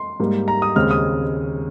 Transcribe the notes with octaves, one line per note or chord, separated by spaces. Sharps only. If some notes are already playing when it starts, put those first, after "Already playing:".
Already playing: C6
G#2 G3 A#3
A#5
D#6
D#2 C#3 G#3 C4 F6
D#6